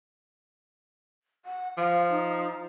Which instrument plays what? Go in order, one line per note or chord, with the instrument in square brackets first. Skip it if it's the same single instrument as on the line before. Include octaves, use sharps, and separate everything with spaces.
[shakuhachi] F#5
[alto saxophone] F3 [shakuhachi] F5
[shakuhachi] D#4